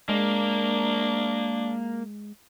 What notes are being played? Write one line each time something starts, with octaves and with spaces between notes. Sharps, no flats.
G#3 A#3 D4